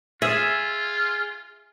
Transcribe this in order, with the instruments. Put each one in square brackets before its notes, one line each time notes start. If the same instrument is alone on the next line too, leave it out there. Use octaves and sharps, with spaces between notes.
[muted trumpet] F4 [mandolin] G#4 [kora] E5